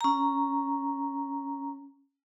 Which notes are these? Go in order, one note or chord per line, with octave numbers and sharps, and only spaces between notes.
C#4 A#5